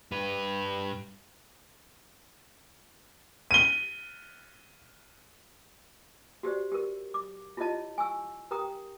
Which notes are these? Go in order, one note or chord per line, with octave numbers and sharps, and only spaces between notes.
G2 B4
D#7 G7
F#4 G4 C5 D5
G4 A#4
D6
E4 F4 G4 C#5 D#5 A5
G#5 C#6 E6
G4 A#4 G5 A#5 D#6